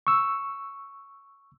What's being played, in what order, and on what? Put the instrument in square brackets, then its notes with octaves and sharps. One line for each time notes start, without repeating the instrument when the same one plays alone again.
[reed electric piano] C#6 E6